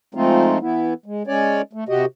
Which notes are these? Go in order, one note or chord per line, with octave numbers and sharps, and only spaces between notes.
F3 G#3 A3 C4 D#4 F4
E3 B3 E4
G#3
G#3 C#4 C#5 D5
A3
C3 F#4 G4 D#5